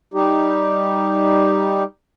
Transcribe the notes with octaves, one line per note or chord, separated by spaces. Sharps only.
G3 D#4 G4